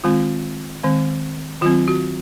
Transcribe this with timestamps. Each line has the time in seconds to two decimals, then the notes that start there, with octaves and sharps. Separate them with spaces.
0.04 D#3 G#3 C4 F4
0.83 D#3 G#3 C4
1.61 D#3 F#3 C4 F4
1.88 F#4